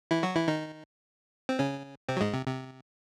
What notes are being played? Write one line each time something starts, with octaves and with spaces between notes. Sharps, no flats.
E3 E4
F#3 F#4
E3 E4
D#3 D#4
C4
C#3 C#4
C3 C4
F#3
G#2 G#3
C3
C3